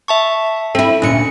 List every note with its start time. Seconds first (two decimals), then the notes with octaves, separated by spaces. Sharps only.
0.08 E5 A5 C#6
0.75 C4 E4 A4
1.02 D2 A#2 C#4 C#7